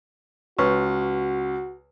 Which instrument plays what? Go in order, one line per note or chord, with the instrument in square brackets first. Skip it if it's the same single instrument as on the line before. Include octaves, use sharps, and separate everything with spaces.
[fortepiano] C#2 [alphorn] F#4 [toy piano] B4 C#5 C#6